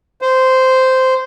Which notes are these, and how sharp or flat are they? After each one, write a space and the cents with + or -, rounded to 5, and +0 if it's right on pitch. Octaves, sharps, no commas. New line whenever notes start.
C5 -10